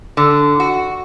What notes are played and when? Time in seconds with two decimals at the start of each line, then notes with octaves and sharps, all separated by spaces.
0.17 D3
0.60 F#4